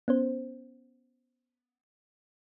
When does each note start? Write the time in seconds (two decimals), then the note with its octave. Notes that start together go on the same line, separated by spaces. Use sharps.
0.08 B3 C#4 C5